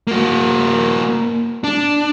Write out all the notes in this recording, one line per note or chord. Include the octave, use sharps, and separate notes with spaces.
A#3 F#4
D4